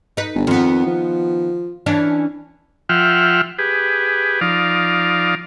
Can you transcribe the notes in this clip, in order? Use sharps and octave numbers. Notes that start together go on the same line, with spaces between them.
D#4 B4
G1
F2 D#3 B3
F3
E3 C#4 D4
F3 F4 E5 F#5 G5 F6
G4 G#4 B4
F3 D#4 D5 F5